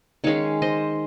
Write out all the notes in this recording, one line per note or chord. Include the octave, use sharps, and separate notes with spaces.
D#3 G#3 C#4 C#5 F5
C5 D#5